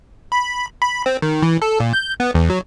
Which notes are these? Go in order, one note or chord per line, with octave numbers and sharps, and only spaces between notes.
B5
B5
C4
D#3
E3
A4
A#2
G6
B3
E2
F#3